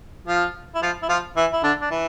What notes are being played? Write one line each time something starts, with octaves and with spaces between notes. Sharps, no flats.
F3 F4
E4
F3 F4
E4
F3 F4
E3 E4
E4
D3 D4
D4
E3 E4